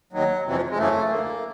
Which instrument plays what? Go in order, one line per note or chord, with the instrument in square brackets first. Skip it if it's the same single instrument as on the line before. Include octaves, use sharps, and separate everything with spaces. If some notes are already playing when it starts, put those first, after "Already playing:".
[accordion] D#2 D#3 F#3
F2 C3 E3 F#3
F3
G#3
F#2 C#3 E3 A3
D2 D3 A#3